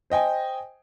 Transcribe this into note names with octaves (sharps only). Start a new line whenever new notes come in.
C5 D#5 G5 G#5